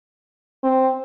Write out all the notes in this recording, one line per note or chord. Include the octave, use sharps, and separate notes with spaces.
C4